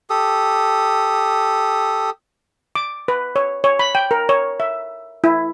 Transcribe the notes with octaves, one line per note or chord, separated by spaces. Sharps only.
G4 A4 D#6
D6
B4
C#5
C#5
B5
G5
A#4
C#5
E5
E4